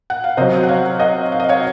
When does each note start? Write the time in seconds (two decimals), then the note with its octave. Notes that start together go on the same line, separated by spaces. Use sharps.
0.10 F#5
0.24 F5
0.37 C3 F#3 C5 D#5
0.63 F#5
0.69 C#5 F5
0.99 D#5 F#5
1.32 F5
1.40 D#5
1.49 C#5 F5